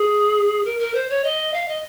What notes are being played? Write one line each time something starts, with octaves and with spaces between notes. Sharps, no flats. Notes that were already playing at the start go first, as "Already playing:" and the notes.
Already playing: G#4
A#4
A#4
C5
C#5
D#5
F5
D#5